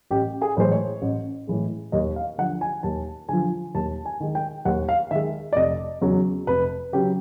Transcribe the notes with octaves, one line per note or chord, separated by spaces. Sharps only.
A1 G4
G#4
A2 E3 G#3 C5
C#5
A1
A2 E3 G#3
D#2 D#5
F5
D3 F3 F#5
G#5
D#2 A5
D3 F3 G#5
D#2 A5
G#5
D#3 G#3
G5
D#2 F#5
F5
D#3 G#3 E5
D5
F1 D#5
E2 C#3 F#3
F1 B4
C#3 F#3 G4